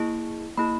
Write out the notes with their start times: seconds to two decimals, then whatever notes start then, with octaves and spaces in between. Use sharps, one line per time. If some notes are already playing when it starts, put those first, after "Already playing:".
Already playing: A#3 E4 G#4
0.58 A#3 E4 G#4 B5